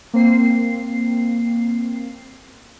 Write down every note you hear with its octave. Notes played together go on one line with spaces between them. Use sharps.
A#3 C4 C7